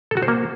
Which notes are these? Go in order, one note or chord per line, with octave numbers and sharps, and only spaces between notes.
A4
F#4
C5
A#3